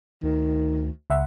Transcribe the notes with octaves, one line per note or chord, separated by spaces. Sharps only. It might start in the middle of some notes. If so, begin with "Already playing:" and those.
D2 D#3
C#2 E5 F#5